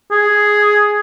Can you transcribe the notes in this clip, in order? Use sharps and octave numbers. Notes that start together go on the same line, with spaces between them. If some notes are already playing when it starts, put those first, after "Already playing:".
G#4